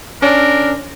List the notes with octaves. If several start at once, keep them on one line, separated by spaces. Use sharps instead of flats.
C#4 D4 A#4